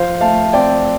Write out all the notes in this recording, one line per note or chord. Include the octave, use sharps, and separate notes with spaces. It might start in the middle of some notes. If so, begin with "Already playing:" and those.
Already playing: F3 C5 F5
A3 F5 A5
C4 D5 G5